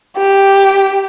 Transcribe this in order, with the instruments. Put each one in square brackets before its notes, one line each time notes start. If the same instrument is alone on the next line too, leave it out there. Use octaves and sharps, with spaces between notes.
[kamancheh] G4